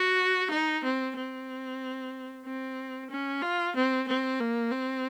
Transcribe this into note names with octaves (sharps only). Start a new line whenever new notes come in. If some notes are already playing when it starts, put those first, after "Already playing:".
Already playing: F#4
D#4
C4
C4
C4
C#4
F4
C4
C4
A#3
C4